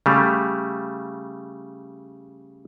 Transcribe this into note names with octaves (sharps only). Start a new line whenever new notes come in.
C#3 G3 A3